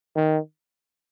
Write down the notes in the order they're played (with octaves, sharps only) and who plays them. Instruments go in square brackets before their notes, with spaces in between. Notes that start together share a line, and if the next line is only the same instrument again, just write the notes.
[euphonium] D#3